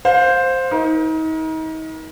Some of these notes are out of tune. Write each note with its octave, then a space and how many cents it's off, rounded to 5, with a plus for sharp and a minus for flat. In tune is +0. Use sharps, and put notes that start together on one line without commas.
C5 +0 F5 +25
D#4 +35 A#4 +35